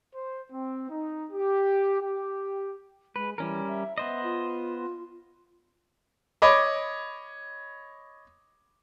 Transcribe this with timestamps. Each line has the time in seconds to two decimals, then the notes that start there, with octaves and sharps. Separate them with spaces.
0.15 C5
0.52 C4
0.90 D#4
1.31 G4
2.01 G4
3.16 G#3 B4
3.38 E3 G3 C#4 A#4
3.68 E5
3.98 B3 C5 D#5 E5
4.23 F4
6.42 C#5 D#5 B5 D6